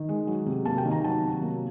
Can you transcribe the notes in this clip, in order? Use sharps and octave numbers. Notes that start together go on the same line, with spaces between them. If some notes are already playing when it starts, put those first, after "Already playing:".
Already playing: D#3
G#3
F#3
C3
A#3 A5
G5
D#3
A#5
F#3 A5
C3
A#3